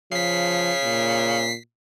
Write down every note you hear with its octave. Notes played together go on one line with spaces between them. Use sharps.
C#3 F3 B6 C7
A#2